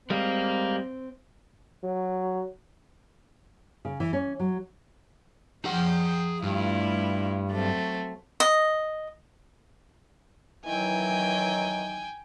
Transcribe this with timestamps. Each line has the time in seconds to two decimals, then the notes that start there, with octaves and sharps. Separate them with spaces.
0.10 G3 G#3 C4 A#4 F5
1.84 F#3
3.85 C#3
4.00 E3
4.13 C#4
4.40 F#3
5.65 F3 G#4 F#5 G5
6.43 G2 A3 E4 F4
7.50 F#3 A3 C4
8.40 D#5
10.65 D#3 E3 F#3 G5 G#5